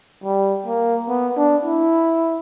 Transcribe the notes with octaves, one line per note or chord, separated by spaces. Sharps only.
G3
A#3
B3
D4
E4